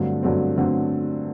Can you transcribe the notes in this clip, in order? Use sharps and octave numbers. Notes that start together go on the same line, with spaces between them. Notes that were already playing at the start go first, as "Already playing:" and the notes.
Already playing: G2 D3 F#3 A3 C4
G2 D3 F#3 A3 C4
G2 D3 F#3 A3 C4